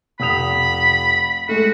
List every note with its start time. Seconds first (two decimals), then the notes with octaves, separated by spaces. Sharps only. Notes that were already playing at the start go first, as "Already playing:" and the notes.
0.20 F1 B5 D#6 F7
1.49 G#3 A3 F#4